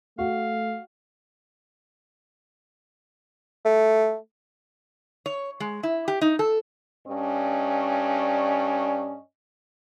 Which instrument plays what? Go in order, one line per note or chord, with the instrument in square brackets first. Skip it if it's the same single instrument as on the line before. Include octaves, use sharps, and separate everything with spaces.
[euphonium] A3 [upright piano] F#4 [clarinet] F5
[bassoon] A3
[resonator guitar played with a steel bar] C#5
G#3
E4
G4
D#4
A4
[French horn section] G2 C#4 D5 D#5